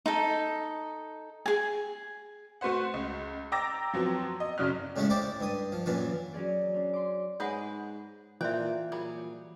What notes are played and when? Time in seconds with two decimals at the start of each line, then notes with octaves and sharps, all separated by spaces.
0.06 D#4 A4
1.46 G#4 G#5
2.61 A3 F#4 B4 C5 F#5
2.94 C#2
3.52 G5 A#5 D6 E6 A6 A#6
3.94 F3 F#3 B3 C4
4.40 D#5
4.58 G1 C#3 F#3 D4 F6
4.96 A2 C#3 G#3 C#4 E4
5.10 E4 G4 C5 D5
5.41 G2 D#6
5.72 F3
5.86 F#2 A#2 E3 F4
6.33 F#3 C#4 G#4 D5
6.74 C#4 D4
6.93 C6 D6
7.40 G#2 G#4 B4 C#5 D#5 F#5 G#5
8.41 A#2 E3 F4 C5 D5 E5 G5
8.92 A#2 F#3 G3 G#4